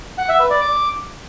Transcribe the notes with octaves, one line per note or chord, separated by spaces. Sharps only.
F#5
E5
B4
D5
D6